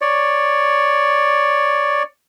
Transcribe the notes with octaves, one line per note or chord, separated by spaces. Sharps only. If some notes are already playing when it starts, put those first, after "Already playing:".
C#5 D5